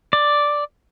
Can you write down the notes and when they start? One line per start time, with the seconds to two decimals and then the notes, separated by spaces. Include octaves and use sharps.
0.13 D5